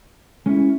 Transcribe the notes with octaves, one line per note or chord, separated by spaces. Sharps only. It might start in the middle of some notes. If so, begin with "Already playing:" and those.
G#3 C#4 E4